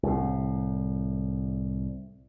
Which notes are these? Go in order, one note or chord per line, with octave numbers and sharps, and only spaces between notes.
C2 A2